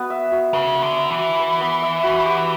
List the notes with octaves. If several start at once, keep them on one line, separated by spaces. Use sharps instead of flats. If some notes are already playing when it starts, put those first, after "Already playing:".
Already playing: B3 F#4 B4
E5
F#4
C#3 B4
B3
D3
E5
E3
F#4
B4
B3
E5
F#4
G4